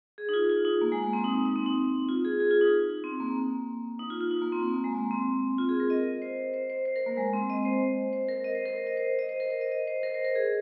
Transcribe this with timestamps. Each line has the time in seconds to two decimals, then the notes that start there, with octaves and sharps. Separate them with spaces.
0.18 G#4
0.29 D#4
0.34 F4
0.50 F4
0.65 D#4
0.81 A#3
0.92 G#3
1.03 A#3
1.13 C4
1.24 D#4
1.34 D#4
1.45 D#4
1.56 C4
1.66 D#4
2.09 F4
2.25 G#4
2.40 G#4
2.51 F4
2.61 D#4
3.04 C4
3.20 A#3
3.99 D#4
4.10 F4
4.20 F4
4.31 D#4
4.42 A#3
4.52 C4
4.63 A#3
4.74 A#3
4.84 G#3
4.95 A#3
5.11 C4
5.58 F4
5.69 G#4
5.80 A#4
5.90 D#5
6.22 C5
6.54 C5
6.70 C5
6.86 C5
6.96 A#4
7.06 A#3
7.18 G#3
7.33 C4
7.50 D#5
7.65 C5
8.13 C5
8.29 A#4
8.44 D#5
8.55 C5
8.66 A#4
8.76 C5
8.87 D#5
8.97 C5
9.19 D#5
9.29 C5
9.40 A#4
9.50 C5
9.61 D#5
9.72 D#5
9.87 C5
10.03 A#4
10.14 C5
10.25 A#4
10.35 G#4